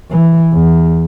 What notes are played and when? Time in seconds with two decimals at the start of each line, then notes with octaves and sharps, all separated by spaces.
0.11 E3
0.53 E2